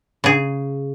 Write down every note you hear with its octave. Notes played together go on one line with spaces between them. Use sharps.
C#3 G#4